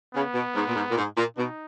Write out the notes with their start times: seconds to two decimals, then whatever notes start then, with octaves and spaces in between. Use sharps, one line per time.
0.14 C#3 B3
0.34 B2
0.54 G#2
0.67 A#2
0.75 G#2
0.90 A#2
0.97 G#2
1.17 A#2
1.37 B2 D#4